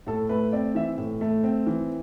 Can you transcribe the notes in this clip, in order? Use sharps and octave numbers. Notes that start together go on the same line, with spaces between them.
A2 A4
A3 B4
C4 D5
E3 E5
A2
A3
C4
E3